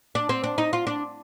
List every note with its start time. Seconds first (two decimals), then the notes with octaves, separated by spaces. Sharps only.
0.15 D4
0.29 C4
0.44 D4
0.58 D#4
0.73 F4
0.87 D4